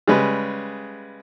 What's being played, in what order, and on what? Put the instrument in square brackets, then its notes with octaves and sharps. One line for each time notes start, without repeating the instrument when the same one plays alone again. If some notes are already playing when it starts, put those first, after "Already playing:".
[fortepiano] C#3 G3 G#3 B4